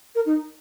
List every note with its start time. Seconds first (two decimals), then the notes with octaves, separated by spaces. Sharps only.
0.15 A#4
0.26 D#4